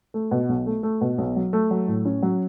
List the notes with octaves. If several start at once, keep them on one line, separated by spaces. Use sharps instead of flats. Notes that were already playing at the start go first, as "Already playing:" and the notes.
A3
B2
B1
A3
A3
B2
B1
F#3
A3
F#3
A2
C#4
F#3